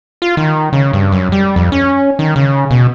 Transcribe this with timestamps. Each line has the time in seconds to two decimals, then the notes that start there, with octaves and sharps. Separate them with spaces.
0.22 F4
0.37 D#3
0.73 C#3
0.93 G2
1.12 F#2
1.32 G3
1.56 F2
1.72 C#4
2.19 D#3
2.36 C#3
2.71 B2